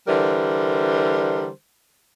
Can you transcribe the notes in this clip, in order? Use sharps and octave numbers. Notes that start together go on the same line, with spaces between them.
D3 E3 G3 A#4 C5